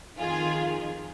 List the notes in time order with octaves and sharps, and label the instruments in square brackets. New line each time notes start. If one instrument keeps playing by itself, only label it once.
[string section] F2 D#3 F4 G#4